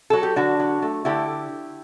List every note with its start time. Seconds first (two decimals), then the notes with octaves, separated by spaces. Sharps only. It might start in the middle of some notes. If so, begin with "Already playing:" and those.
0.10 F#3 A4
0.23 G4
0.36 D3 D4 F#4
0.59 F#3
0.82 A3
1.05 D3 E4 G4